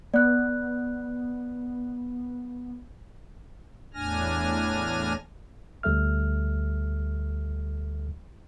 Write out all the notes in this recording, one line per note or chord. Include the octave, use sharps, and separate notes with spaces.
B3 D5 F#6
E2 A2 D4 G#5 F6 A#6
D2 G3 A4 E5 F6